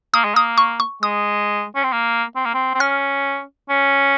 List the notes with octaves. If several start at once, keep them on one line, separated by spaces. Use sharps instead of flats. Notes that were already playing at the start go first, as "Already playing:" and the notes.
A#3 D#6
G#3
A#3 D#6
C#6
C#6
G#3 D#6
C#4
C4
A#3
C4
A#3
C4
C4
C#4 F6
C#4